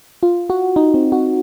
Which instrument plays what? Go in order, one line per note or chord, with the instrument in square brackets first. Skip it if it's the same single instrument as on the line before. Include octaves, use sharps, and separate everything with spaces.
[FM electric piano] F4
F#4
D#4
C4
F#4